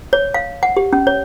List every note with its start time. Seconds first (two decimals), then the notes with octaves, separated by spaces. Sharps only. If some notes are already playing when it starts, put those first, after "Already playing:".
0.13 C#5
0.34 F5
0.63 F#5
0.77 G4
0.93 C#4
1.07 C#5